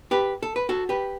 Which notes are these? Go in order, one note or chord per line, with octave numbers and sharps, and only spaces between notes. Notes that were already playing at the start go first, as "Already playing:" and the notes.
G4 B4
A4
B4
F#4 A4
G4 B4